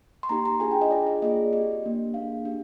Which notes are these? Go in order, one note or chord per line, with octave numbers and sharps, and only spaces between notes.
C6
A#3 D#4 G4 A#5
A#5
D4 F4 G#4 G#5
G5
D#5
D4 F4 G#4 D5
D5
A#3 F4 G#4 D#5
C4 G4 D#5
A#3 D4 G4
A#3 D4 G#4 F5
D4 G4